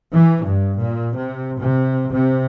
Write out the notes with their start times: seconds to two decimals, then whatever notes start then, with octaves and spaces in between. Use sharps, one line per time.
0.13 E3
0.44 G2
0.80 A#2
1.15 C3
1.60 C3
2.11 C3